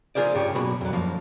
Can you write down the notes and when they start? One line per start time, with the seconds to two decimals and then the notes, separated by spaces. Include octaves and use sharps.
0.15 F4 G#4 A#4 C5 D5
0.34 G2 C#3 G4 C#5
0.55 B1 A#3 F#4 B5
0.81 F2 F#3
0.93 F#2 F3 A#3